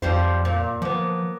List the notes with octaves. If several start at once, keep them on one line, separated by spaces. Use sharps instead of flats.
F2 F3 G3 C5
A#2
F3 A#3 B3